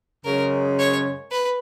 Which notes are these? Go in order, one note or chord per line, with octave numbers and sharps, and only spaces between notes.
F#2 C#3 G#3 A#4
C#5
B4